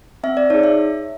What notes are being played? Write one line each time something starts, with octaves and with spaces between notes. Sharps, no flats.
C4 E5
D5
D#4 G#4 C#5
E5